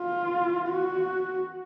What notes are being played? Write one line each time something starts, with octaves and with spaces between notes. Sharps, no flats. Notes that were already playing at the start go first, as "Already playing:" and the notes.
Already playing: F4
F#4